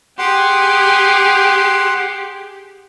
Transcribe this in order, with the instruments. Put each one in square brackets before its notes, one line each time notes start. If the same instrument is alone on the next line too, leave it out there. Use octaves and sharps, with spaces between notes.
[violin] G4 G#4 [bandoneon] F#5 C6